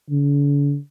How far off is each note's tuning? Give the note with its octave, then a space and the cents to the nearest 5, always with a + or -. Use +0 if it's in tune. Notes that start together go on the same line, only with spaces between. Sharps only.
D3 -45